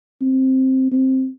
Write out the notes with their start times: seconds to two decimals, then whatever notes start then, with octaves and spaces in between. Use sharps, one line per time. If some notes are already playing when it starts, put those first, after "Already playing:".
0.21 C4
0.92 C4